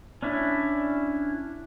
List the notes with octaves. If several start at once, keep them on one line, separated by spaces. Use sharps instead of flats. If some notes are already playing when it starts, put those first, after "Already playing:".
C#4 D4 E4